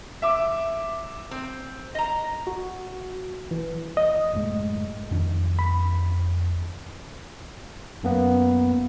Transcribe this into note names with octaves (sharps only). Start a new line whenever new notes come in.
E5 D6
C4
D#5 A#5
F#4
E3
D#5
F#1 A2 G#3
F2 D#3 D4
B5
F#2 A#3 B3